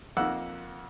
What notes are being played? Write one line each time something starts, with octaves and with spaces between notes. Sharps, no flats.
F2 A#3 F#5 E6